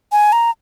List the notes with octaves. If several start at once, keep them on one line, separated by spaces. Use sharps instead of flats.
G#5
A#5